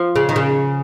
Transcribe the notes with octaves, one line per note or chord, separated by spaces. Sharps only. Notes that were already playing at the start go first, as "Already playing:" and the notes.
Already playing: F3
C#3
D#3
C#3